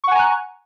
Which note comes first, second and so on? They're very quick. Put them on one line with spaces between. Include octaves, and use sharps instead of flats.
C#6 F#5 G#5 A#5 F#6